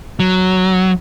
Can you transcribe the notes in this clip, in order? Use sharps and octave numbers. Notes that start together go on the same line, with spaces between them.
F#3